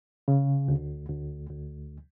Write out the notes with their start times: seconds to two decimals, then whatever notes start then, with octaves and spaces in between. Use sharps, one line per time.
0.28 C#3
0.68 D2
1.09 D2
1.50 D2